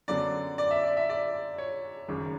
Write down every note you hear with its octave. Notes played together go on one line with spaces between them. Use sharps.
F#2 D3 F#3 B3 D4 D5
D5
E5
D5
E5
D5
C#5
G#1 F#2 C#3 F#3